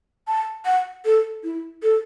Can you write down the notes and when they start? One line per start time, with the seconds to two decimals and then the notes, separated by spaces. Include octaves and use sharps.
0.28 A5
0.65 F#5
1.05 A4
1.44 E4
1.83 A4